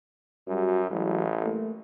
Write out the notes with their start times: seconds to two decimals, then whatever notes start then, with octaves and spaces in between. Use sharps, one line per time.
0.47 F#2 G3 F#4
0.90 A1 E3 F#3 G#3
1.42 A3 A#3